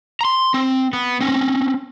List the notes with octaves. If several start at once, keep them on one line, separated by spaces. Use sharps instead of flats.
A#5 C6
C4
B3
C4 C#4